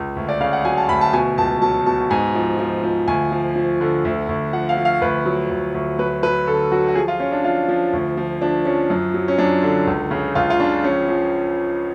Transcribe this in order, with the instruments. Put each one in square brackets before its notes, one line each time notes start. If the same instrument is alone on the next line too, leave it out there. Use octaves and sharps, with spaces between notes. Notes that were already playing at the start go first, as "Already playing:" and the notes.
Already playing: [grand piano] C#2
D2
D5
C#3 F5
F#5
F#3 G#5
A5
D2 B5
A5
B2 G#5
C#2 A5
F#3 A5
B2 A5
G#2 G#5
F3
F3
F3
D2 G#5
F3
F3
D3
D2
D2
F3 F#5
F5
F3
F5
D2 B4
F#3
D2
D2
F#3 B4
F#3 B4
D3 A4
F#3 F#4
F#4
F3 G#4
F4
F3 C#4
D4
F3 F4
F3
D2
F3
F3 D4
F3 C#4
F#2
F#3
C#4
F#2 D4
D3
C#2
C#3
C#2 F4
F4
C#3 D4
F3 C#4
F3